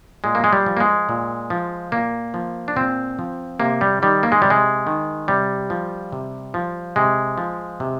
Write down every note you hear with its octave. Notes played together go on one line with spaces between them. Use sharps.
A#2 G#3
A#3
G#3
G3
F3
A#3
G#3
A#2
F3
A#2 A#3
F3
D4
A#2 C4
F3
C3 A#3
G3
D#3 G3
A#3
G#3
C3 G3
G#3
D#3
C3 G3
F3
C3
F3
C3 G#3
F3
C3